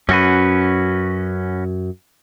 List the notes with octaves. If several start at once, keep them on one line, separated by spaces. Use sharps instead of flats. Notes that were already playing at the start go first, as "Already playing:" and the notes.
F#2 C#4 F#4 B4